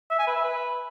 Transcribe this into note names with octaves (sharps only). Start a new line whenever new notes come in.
E5
G#5
B4
E5
B4